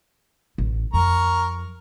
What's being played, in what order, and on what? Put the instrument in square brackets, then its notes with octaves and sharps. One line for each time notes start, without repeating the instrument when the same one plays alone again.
[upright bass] A1
[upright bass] F2 [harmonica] A#4 A#5 C#6